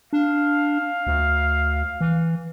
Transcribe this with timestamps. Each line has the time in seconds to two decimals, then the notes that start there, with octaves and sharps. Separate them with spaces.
0.13 D4 F5
1.07 D2
2.01 E3